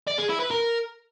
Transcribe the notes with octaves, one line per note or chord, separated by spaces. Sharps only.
D5
G#4
E4
B4
A#4